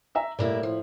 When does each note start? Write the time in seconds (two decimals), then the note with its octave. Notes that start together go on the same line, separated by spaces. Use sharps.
0.15 E5 A#5 E6
0.39 A2 G3 A#3 E4
0.63 F3